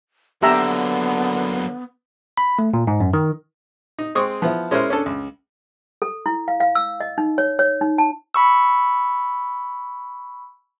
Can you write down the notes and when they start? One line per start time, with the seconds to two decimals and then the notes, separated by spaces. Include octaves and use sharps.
0.43 D3 F#3 A#3 B3 G4 E5 A#5
2.37 B5
2.59 A3
2.74 A#2
2.87 G#2
3.00 F#2
3.13 D#3
3.99 D#4
4.15 G#3 C4 C#6 D#6
4.42 F3 B3 E4
4.71 G#3 C#4 E4 A#4 C5
4.90 C#4 D4 A4
5.06 C#2
6.02 A4
6.26 E4
6.48 F5
6.60 F5
6.75 E6
7.00 D#5
7.18 D#4
7.38 C#5
7.59 C#5
7.81 D#4
7.98 A5
8.34 B5 C#6 E6